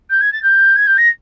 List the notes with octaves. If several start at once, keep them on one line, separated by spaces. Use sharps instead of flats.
G6
G#6
A6
G6
G#6
G6
A#6